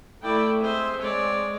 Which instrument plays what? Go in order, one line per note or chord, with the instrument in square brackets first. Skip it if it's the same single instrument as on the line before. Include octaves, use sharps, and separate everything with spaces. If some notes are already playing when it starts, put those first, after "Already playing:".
[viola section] A3 E4 G5 [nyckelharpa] D5
[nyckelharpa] G#3 C5 [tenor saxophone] C4 [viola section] E5
[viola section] G#3 [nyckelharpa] C#5 D5